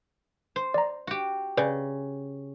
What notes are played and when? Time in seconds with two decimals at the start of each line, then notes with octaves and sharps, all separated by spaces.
0.56 C5
0.74 D5 A#5
1.07 F#4 G4
1.57 C#3 B4 D5 G6